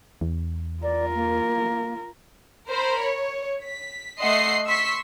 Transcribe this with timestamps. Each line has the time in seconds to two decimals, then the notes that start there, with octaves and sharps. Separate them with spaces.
0.21 E2
0.83 F4 A#4 D5
1.15 A#3
2.68 A#4 C5 B5
2.99 C#5
3.62 B6
4.20 A3 D#5 E5 F#5 C6 C7
4.66 C6 C#6 E6 B6 C7